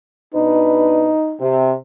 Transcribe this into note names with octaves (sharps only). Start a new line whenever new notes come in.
B2 D4 D#4 B4
C3